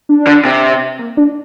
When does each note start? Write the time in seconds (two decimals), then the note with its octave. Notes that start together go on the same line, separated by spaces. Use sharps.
0.09 D4
0.27 D3
0.45 C3
0.99 A#3
1.17 D4